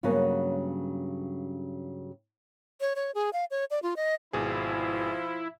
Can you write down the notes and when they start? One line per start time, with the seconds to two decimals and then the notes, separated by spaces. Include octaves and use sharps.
0.03 G2 C#3 F#3 A#3 B3 C#4
2.81 C#5
2.96 C#5
3.15 G#4
3.33 F5
3.51 C#5
3.71 D5
3.83 F4
3.97 D#5
4.33 G#1 B2 F3 E4 G#4